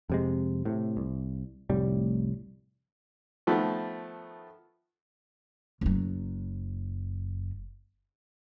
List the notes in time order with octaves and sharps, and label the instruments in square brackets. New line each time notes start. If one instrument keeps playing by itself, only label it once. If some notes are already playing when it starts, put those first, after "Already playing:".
[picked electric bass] F2 C3 G#3
A2 C3
C2
F1 C2 A2 G3
[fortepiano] D#3 F3 A3 B3
[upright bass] F#1 F#3